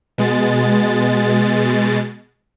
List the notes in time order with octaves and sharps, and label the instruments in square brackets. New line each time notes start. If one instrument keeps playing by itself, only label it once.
[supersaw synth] B2 G#3 A6